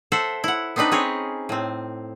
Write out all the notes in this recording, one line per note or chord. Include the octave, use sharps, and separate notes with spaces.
A4 C5 E5 F#5
E4 F#5
B3 C4 D4 D#4 B4
C4 C#4 G#4 B4 C#5
A2 C4